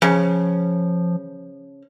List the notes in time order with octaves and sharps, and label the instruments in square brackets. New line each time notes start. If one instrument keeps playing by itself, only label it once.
[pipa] C#3 [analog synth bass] F3